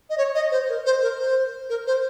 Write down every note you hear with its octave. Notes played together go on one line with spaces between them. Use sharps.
D#5
C#5
D#5
C5
A#4
C5
A#4
C5
A#4
C5